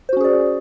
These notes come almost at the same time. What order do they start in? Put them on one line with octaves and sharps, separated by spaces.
C5 F#4 C#4 G#4 D5